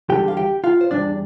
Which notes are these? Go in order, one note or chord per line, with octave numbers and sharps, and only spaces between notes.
E2 D3 G3 G4 G5
F5
G4 G5
F4 F5
C5
D3 G3 D4 D5
E2